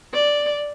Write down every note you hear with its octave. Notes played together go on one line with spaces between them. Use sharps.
D5